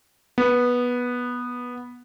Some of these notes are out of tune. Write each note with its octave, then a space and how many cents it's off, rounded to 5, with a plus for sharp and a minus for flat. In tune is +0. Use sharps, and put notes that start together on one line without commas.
B3 -10